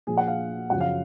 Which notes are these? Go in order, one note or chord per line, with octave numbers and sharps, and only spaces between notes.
A#2 F3 G#4
F#5
F5
F#2 C#3 F3 F#5
F5